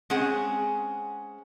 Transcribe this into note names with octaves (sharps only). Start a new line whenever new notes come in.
G#3 C4 C#4 G#4 F#5